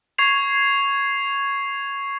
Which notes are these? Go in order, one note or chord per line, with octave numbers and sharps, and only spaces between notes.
C#6 G#6 C7 F7